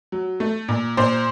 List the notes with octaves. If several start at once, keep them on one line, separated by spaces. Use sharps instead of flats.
F#3
A3
A#2
A#2 C5